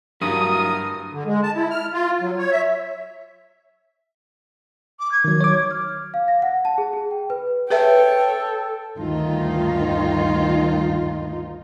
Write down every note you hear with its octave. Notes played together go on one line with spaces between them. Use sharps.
G2 F#3 E4 F#4 A#4 D#6
D3
G#3
A5
E4
F6
F4
F#3
C#5
E5
D6
G#6
D#3 F#3 G#6
C#5 D6
F6
F5
A#6
F#5
A5
G#4
G#4
G5
B4
G#4 A4 B4 C#5 E5 G5
D2 G2 D#3 D#4 F4